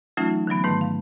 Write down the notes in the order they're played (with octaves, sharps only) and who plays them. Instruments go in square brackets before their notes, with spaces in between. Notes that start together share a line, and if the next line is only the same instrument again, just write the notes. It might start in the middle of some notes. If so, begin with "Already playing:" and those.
[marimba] E3 F#3 A3 C#4 D#4 F4
D3 E3 F#3 B3
G#2 D#3 A3 B4
F5